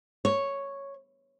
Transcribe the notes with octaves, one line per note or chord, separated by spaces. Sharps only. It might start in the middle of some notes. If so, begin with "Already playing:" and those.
C#5